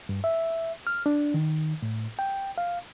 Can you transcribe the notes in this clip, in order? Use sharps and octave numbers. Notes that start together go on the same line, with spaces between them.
G2
E5
F6
D4
D#3
A2
G5
F5